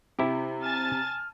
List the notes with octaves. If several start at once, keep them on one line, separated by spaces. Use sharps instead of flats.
C3 E4 G4
G#5 A5 F6 A6